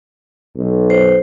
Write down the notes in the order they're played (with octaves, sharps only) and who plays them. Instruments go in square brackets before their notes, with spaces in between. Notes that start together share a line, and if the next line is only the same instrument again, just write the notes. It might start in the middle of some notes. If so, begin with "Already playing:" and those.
[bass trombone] B1
[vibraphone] C5